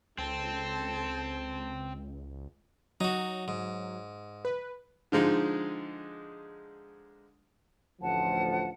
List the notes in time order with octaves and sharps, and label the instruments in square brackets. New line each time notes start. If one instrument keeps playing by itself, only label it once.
[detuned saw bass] C#2 [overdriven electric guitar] C4 [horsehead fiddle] A4 A5
[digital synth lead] F#3 [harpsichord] D#4 F#4
[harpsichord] G#2
[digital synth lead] B4
[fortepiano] D3 F3 G#3 D#4
[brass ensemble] A1 D2 F3 [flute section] F#5 A5